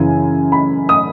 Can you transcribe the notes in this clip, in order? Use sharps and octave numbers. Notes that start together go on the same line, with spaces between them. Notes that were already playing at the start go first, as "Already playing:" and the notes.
Already playing: F#2 C#3 E3 G#5
B5
D#6